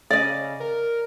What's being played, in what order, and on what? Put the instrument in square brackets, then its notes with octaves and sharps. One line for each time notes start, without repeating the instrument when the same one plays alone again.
[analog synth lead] C#3 [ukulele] D5 D#5
[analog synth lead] A#4